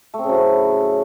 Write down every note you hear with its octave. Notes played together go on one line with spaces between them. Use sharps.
A3
C4
C#3
F#3
A2